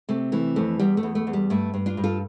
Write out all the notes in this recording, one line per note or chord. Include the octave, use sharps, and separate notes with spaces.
C3 A3
E3 A3
F2 A3
E2 G3
A3
E2
A3
E2
G3
G2 A3
G2
D4 F4
G2
F4 A4